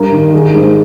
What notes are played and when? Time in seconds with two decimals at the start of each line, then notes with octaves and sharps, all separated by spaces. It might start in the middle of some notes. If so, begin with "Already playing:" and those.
Already playing: G2 A#4
0.12 D#3
0.33 D#3 G#4
0.54 G#2